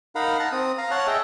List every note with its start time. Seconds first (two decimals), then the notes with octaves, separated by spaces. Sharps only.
0.15 D#4 A#4 F5 F#5 B5
0.40 F#5 A5 A#5
0.52 C4 D#6
0.78 F5 A#5
0.91 C#5 F#5 A5 F6 F#6
1.07 G#4 D#5 E5 G5